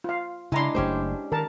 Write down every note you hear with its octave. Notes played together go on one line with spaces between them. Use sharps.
F4 F5
C#3 G#3 D4 E4 A#5 C6
F#1 A3 C#4 G4 C5
D#3 A#4 A5